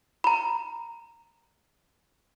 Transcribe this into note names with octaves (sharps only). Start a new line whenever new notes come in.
A#5 B5